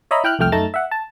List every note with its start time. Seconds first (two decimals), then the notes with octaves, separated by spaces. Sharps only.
0.11 C#5 D#5 E5 A#5 B5
0.24 E4 G5 F6 F#6
0.39 C2 F2 A3 G5 F6
0.52 F#2 A3 D#4 A5 A#5 A6
0.74 E5 F#5
0.91 A5